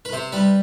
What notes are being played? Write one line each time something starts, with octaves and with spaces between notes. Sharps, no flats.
B4
C3 C5
G3 B4